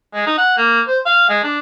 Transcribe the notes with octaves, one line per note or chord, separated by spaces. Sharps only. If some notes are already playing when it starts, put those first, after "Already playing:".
G#3
D#4
F#5
A#3
C5
F5
G#3
D4